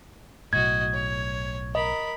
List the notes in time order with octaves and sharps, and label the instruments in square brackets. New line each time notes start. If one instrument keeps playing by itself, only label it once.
[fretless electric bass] B1 A2 [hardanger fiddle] F#4 D#5 [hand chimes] G#6
[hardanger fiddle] C#5
[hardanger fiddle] A#4 B5 [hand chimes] D#5